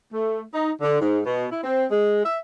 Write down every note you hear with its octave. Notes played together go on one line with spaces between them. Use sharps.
A3
D#4
D3
G#2
B2
E4
C4
G#3
E5